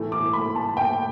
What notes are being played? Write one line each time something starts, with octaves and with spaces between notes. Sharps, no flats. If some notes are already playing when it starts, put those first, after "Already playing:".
Already playing: A2 E3 A3
D6
B5
A5
G5